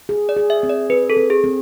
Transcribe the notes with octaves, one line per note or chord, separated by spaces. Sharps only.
G#4
D5
G#4
E5
C4
D5
C4 B4
A4
C4
G#4
C4